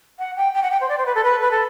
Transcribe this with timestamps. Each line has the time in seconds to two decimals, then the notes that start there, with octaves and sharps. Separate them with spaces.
0.19 F#5
0.36 G5
0.54 G5
0.63 F#5
0.71 G5
0.81 C5
0.89 D5
0.98 C5
1.06 B4
1.15 A4
1.24 B4
1.42 B4
1.51 A4